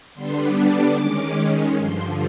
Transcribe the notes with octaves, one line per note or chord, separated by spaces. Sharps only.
D3 G3 B3 D4 C6
D6
D#3 G#3 C#4
G2 D3 F3 C6